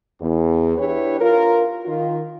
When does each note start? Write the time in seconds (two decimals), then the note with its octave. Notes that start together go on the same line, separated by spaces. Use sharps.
0.21 E2
0.78 D4 E4 G4 B4 C#5
1.21 F4 A#4
1.86 D#3 F4